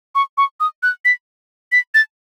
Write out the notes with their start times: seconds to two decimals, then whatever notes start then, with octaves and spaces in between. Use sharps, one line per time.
0.15 C#6
0.38 C#6
0.60 D#6
0.83 F#6
1.05 B6
1.72 B6
1.94 A6